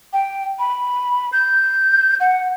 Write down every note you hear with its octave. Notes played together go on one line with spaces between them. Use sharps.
G5
B5
G6
F#5